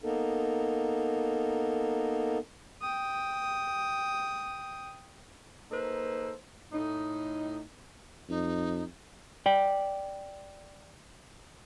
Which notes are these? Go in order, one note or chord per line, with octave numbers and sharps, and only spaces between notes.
A#3 B3 D#4 A4 A#4
G5 D#6
A#3 D#4 A4 B4 C5
A2 D#4
F2 D#4
D5 G5